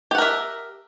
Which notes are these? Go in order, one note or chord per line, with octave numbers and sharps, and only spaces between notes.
G4 A#4 E5 F#5